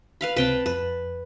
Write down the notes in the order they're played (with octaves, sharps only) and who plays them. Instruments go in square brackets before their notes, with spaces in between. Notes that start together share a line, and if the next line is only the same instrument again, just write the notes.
[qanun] B4 F5 B5
[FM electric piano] C#2 C3 C4 [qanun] B4 G5 A5
[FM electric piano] F2 [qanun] B4